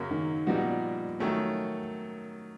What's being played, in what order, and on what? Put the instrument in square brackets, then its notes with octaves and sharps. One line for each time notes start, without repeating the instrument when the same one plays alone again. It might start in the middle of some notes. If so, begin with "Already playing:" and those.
Already playing: [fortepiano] F#2 C#3 F#3 A#3
[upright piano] D#3
[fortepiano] A#2 G3 B3 D#4 F#4 [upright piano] F3
[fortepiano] D#3 F#3 A3 C#4